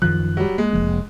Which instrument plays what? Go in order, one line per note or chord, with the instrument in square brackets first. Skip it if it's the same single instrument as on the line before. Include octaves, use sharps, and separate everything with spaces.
[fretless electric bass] F#2 D#3 F3 [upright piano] F#6
[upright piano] F#3 G3
[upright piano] G#3 [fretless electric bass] A#3
[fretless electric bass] F1 F3 A#3